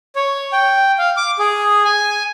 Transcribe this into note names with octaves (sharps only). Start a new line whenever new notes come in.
C#5
G5
F5
D6
G#4
G#5